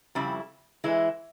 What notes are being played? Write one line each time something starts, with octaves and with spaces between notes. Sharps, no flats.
F2 C#3 G3 C4 E4
E3 G#3 E4